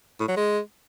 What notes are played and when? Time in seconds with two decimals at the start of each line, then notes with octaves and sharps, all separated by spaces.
0.20 A2
0.28 F#3
0.36 G#3